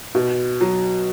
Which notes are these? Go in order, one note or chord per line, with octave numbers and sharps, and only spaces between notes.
B2
F#3